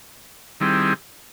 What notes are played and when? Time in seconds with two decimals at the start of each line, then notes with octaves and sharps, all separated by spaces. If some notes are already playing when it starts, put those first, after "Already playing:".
0.60 D#3 G3 C4 E4 G#4